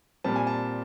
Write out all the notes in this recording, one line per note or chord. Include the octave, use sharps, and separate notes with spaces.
A#2 G3 C4 A5
G#5
A5